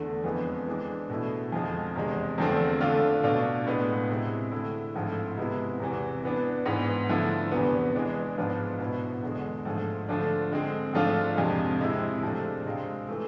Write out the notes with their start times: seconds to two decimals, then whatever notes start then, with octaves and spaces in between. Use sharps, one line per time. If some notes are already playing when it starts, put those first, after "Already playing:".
Already playing: E2 D3 A3
0.24 F2 E3 G#3 B3
0.67 E3 G#3 D4
1.09 B2 A3 E4
1.52 F2 D3 F3 G#3
1.96 E2 C3 G#3
2.38 E2 D3 F3 A3 C4
2.80 D3 A3 D4 F4
3.24 B2 A3 D4 F4
3.67 A2 G#3 B3
4.09 C3 G#3 C4 E4
4.52 D3 A3 E4
4.95 G#2 F3 A3 C4 E4
5.38 C3 G#3 B3 E4
5.80 E2 C3 E3
6.24 E3 B3 D4
6.66 G#2 E3 B3
7.09 D3 F3 A3 E4
7.52 E2 C3 E3 B3
7.95 E3 G#3 D4
8.37 G#2 F3 B3 D4 F4
8.79 B2 B3 E4
9.22 E2 D3 G#3
9.65 G#2 F3 A3
10.08 D3 F3 A3 D4
10.52 D3 G#3 C4
10.93 G#2 F3 A3 D4 F4
11.37 F2 C3 F3 G#3
11.79 C3 G#3 C4 E4
12.22 C3 F3 A3 D4
12.65 C3 G#3 C4 F4
13.08 E3 A3 C4